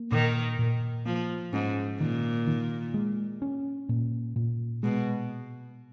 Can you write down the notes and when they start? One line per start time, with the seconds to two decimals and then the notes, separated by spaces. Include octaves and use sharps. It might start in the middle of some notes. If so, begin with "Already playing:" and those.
Already playing: A#3
0.12 A#2 D#3
0.59 A#2
1.06 F3 A#3
1.53 G#2 C#4
2.01 A#2 D#3
2.47 D#3
2.94 G#3
3.42 C#4
3.89 A#2
4.36 A#2
4.83 B2 G#3